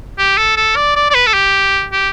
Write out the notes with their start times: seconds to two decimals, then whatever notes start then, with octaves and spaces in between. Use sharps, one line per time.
0.18 G4
0.38 A4
0.57 A4
0.76 D5
0.96 D5
1.10 D5
1.14 B4
1.27 A4
1.34 G4
1.92 G4